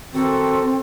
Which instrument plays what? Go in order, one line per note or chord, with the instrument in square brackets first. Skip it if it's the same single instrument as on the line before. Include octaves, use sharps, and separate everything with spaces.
[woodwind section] D#3 F#4 A4 [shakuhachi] C4